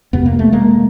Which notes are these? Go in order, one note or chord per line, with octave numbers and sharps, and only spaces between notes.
F2 C3 B3
A#3
A3
G#3 A#3